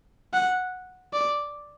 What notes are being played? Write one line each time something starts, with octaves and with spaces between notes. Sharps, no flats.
F#5
D5